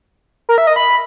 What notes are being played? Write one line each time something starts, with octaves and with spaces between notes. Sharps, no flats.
A#4
E5
D#5
B5